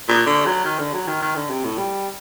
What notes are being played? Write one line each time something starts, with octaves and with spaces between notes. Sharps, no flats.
A#2
D3
F#3
D#3
D3
F#3
D#3
D#3
D3
C3
A2
G3